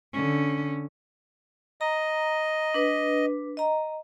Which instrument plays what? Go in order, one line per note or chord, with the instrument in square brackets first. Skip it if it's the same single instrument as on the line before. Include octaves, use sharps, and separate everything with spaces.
[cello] D3 C#4
[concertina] D#5 [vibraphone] A#5
[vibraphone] D4 B4
D#5 A#5